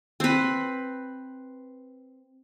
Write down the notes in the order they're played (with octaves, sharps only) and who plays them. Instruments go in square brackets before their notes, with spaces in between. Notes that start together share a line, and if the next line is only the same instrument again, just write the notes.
[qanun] C4 B4